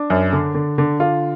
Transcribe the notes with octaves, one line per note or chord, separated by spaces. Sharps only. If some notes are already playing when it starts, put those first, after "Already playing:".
Already playing: D4
F#2
D3
D3
D3
D3 F4